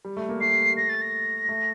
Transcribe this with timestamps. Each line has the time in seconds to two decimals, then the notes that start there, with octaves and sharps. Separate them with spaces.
0.05 G3
0.17 A3
0.29 A#3
0.40 A3 C7
0.77 A#6
0.89 A6
1.02 A#6
1.49 A3